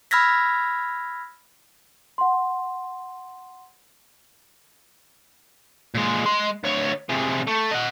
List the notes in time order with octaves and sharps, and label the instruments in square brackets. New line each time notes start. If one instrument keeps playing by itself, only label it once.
[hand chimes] B5 E6 F6 G#6 A#6 B6
[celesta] F#5 C6
[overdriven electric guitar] A#2 G#3
G#3 C6
D2 C#5
C3 G#3
A3
D#5 F#5